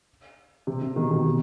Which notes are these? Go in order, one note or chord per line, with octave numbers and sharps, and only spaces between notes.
C3
C3
B2 D#3
B2 D#3
C3